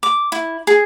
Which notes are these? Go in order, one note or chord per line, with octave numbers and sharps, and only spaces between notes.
D6
E4
G#4